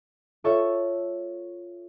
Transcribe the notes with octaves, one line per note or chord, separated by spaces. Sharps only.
F4 A4 C#5 E5